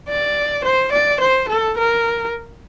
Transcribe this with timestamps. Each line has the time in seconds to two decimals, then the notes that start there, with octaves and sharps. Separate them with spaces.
0.09 D5
0.65 C5
0.93 D5
1.21 C5
1.49 A4
1.78 A#4